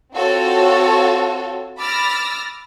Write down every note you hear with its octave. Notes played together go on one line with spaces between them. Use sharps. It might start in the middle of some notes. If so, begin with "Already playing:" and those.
C4 F4 F#4 A4 C#5
B5 D6 E6 F6 A6 A#6